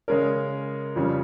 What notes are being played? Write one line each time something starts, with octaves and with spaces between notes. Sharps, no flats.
C#3 G#3 C#4 A#4
F2 C#3 G3 C#4